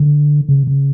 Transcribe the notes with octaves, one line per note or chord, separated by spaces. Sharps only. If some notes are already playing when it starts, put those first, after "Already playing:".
Already playing: D3
C#3
C#3